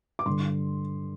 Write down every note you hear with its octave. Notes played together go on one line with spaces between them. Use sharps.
D6
G2 D3 C6